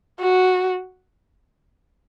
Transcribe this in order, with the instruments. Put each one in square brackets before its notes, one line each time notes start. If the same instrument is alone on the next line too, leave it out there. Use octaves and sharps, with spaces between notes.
[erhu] F#4